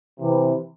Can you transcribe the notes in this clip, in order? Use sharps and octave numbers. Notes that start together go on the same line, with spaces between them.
C3 E3